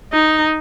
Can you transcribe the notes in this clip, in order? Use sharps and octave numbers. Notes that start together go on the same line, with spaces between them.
D#4